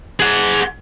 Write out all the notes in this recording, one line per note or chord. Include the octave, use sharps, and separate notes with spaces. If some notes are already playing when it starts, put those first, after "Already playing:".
G#4 F#5